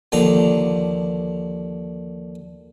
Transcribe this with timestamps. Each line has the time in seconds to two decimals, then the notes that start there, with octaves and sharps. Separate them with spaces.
0.12 D#2 D3 F3 D#4 A#5